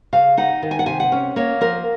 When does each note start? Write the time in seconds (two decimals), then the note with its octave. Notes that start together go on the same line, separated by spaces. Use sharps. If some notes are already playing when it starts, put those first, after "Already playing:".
0.13 C#3 F5
0.37 D#4 F#5
0.62 D#3
0.71 G#5
0.79 F#5
0.86 C3 G#5
1.00 F#5
1.12 C#4
1.36 A#3 C#5
1.61 F3 A#4